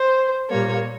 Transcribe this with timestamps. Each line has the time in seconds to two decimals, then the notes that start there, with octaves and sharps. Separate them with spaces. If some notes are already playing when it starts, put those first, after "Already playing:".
Already playing: C5
0.49 A#2 G3 A#3 C#5